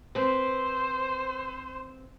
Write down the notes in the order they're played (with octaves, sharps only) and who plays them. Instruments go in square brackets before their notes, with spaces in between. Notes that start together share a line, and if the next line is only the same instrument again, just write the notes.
[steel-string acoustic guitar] C4 B4 [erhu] C5